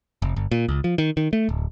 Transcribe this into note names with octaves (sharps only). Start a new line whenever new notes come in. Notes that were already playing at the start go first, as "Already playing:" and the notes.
F1
G1
A#2
C#2
F3
D#3
D#3
A3
D1